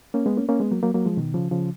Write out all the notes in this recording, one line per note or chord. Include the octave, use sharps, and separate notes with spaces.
A#3 C#4
G#3 B3
A#3 C#4
A#3 C#4
G#3 B3
F#3 A#3
F#3 A#3
F#3 A#3
F3 G#3
B2 D#3
C#3 F3
C#3 F3